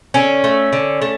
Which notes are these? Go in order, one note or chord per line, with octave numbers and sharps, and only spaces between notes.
D3 C#4
A3
D3
A3